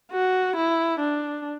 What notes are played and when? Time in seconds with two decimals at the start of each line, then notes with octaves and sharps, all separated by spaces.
0.12 F#4
0.56 E4
0.99 D4